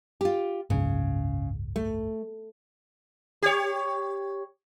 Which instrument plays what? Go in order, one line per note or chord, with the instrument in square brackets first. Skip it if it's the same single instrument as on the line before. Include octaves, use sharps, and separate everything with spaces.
[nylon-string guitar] F4 G4
[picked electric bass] F#1 C#2 G#2 [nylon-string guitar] C#3
[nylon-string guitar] A3
[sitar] G4 C#5